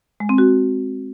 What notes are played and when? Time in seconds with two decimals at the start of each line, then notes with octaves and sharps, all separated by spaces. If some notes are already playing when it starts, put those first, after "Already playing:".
0.20 G#3
0.29 C4
0.38 F#4